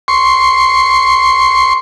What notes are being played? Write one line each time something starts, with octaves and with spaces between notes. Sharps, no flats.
C6 C#6